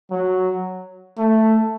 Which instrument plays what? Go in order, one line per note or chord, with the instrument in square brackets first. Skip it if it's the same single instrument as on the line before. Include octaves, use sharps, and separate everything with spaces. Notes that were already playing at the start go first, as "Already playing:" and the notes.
[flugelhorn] F#3
A3